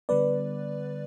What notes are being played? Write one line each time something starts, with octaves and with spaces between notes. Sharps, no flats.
D3 G3 B3 B4 D5